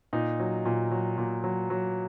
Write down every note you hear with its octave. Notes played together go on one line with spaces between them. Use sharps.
A#2 D#4
F#3
A#2
F#3
A#2
F#3
F#3